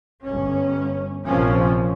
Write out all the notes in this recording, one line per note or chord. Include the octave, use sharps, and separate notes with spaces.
G1 C#4
A#1 C3 F3 A#3 C4 C#4